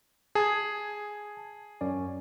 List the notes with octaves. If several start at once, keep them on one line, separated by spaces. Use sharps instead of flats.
G#4 A5 D#6 G#6
F#2 C#4 D5